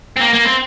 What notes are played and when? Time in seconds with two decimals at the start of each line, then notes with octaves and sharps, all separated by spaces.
0.16 C4
0.20 A#3
0.33 A#3
0.45 C4